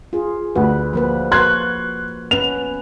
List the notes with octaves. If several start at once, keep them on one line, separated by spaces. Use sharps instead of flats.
F4 G#4
D2 B4
F3 A#3 B4
F#4 B4 C6 F#6 G#6
B3 C#4 B4 F7